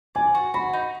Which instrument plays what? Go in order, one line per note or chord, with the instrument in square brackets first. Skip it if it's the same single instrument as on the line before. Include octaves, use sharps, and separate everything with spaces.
[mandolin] D5 [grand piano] G#5
[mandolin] F#4
[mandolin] F#4 [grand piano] B5
[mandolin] D#4